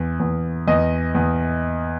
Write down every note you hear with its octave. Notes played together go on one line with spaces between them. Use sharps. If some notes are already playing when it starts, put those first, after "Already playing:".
Already playing: E2
E2
E2 D#5
E2